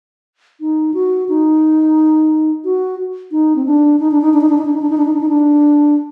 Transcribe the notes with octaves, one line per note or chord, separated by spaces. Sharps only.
D#4
F#4
D#4
F#4
D#4
C4
D4
D#4
D4
D#4
D4
D#4
D4
D#4
D4
D#4
D4
D#4
D4
D#4
D4
D#4
D4